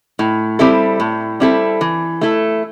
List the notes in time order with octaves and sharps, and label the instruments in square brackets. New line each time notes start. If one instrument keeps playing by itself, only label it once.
[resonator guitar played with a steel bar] A2
G3 C4 E4 A4
A2
G3 C4 E4 A4
E3
A3 E4 A4